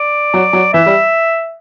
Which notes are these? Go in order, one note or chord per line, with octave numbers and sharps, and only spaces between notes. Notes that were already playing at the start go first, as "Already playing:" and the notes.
Already playing: D5
F#3
F#3
E3 E5
G3